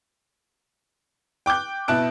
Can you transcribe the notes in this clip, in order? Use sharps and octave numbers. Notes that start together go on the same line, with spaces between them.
G5 D6 F#6 G6
B2 E4 A5 F#6 D7